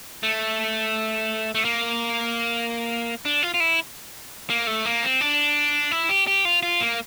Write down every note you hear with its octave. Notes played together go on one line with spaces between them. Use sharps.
A3
A3
A#3
D4
F4
F4
E4
A#3
A3
A#3
C4
D4
E4
G4
G4
F4
F4
A#3